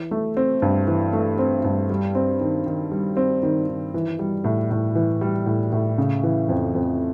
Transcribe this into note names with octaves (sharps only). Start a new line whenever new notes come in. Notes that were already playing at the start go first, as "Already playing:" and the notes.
Already playing: E3
A3
C4
G2
E3
A3
C4
G2
G3
C4
D#3
D#3
G3
C4
D#3
D#3
E3
G3
A2
A2
E3
G3
A2
A2
C#3
E3
F2
F2